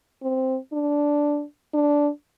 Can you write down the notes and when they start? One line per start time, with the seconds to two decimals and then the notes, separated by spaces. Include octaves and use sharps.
0.22 C4
0.73 D4
1.74 D4